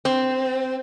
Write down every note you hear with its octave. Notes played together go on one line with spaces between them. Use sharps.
C4